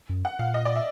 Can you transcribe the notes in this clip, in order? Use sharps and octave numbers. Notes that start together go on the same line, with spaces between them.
F#2
F#5
A#2 F5
D#5
D5
E5